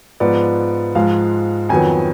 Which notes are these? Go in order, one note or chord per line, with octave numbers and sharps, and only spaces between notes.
G#2 F3 B3 D5
G#2 F3 G#3 F5
F2 D#3 F#3 B3 G#5